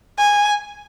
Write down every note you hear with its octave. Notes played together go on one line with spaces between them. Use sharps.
G#5